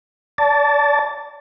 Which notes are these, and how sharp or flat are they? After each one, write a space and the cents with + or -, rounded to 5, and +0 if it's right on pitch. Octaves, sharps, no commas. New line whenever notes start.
D5 -35 A5 +0